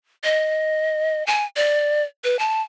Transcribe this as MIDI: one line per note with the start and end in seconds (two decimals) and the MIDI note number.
0.24 1.25 75
1.27 1.45 80
1.56 2.03 74
2.24 2.39 71
2.39 2.62 81